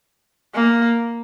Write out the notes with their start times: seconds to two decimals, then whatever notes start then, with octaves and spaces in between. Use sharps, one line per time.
0.54 A#3